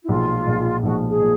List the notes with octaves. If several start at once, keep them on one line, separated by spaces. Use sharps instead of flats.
E4
B1 A#2 F3 G#3 F4
B1 A#2 F3 G#3
B1 A#2 F3 G#3 F#4
G#4
A#2